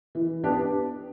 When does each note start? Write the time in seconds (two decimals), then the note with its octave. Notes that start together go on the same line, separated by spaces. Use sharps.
0.15 E3
0.44 B3 D4 G4